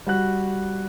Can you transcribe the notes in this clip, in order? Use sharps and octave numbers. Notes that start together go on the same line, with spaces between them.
G3 F#4 F#6